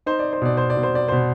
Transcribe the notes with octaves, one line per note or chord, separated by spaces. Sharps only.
D#4 C5
D5
C5
B2 D5
C5
D5
B2
C5
D5
B2 C5